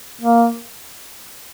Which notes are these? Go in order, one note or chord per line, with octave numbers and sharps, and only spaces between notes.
A#3